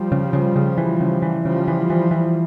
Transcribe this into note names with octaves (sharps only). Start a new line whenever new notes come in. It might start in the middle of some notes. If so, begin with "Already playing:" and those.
Already playing: F3 G3
C#3
C#3
C#3
E3
C#3
E3
C#3 F3 G3
E3
E3
E3